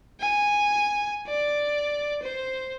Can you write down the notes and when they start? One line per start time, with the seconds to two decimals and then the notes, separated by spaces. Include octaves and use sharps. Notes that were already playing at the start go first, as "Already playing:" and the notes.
0.20 G#5
1.27 D5
2.22 C5